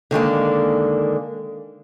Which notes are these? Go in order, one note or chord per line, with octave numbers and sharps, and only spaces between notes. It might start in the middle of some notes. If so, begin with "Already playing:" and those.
D3 D#3 G#3 A#3